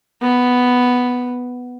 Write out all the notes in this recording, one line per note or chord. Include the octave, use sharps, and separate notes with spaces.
B3